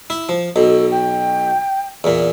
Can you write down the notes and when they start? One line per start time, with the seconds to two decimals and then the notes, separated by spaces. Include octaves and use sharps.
0.10 E4
0.29 F3
0.56 B1 B2 A4
0.91 G5
2.04 E2 A#2